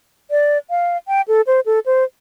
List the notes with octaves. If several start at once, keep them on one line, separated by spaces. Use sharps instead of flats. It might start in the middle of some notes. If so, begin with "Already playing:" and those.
D5
F5
G5
A4
C5
A4
C5